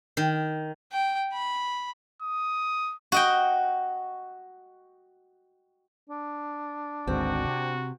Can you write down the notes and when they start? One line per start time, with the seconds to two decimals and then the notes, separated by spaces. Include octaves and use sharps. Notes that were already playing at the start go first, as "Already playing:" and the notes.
0.17 D#3
0.92 G5
1.33 B5
2.22 D#6
3.12 F#4 D#5 G5
6.10 D4
7.07 G#1 D2 G#2 C4 F#4
7.45 C3